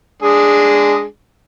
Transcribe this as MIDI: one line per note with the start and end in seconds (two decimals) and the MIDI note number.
0.22 1.04 56
0.22 1.04 62
0.22 1.04 68